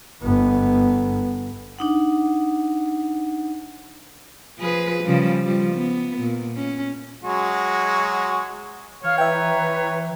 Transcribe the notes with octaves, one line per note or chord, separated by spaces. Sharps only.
G1 B3
D4 D#4 F#5
F3 G#4 B4
C#3 F3 G3
F3 G3
B3
A#2
C#4
F#3 G#3 F#4
E3 C#5 F5 F6
B4 E5 G5 A#5